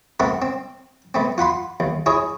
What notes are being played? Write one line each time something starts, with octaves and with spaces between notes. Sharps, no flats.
A3 C4 A#4 F#5
C4
A3 B3 C4
F4 F#5 B5 C6
D#2
E4 G#4 C#5 A#5